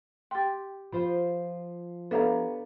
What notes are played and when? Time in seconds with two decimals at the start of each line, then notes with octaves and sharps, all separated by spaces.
0.31 G4 G5 C6 A6
0.92 F3 F4 C5 B5
2.11 B3 D4 G4 A4 C#5 E5 F5 A#5